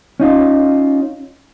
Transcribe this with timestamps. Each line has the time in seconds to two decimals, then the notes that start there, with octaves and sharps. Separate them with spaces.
0.20 C#4 D#4 F4